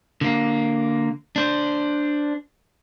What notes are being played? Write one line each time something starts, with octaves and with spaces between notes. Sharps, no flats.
D3 A#3
D4 C5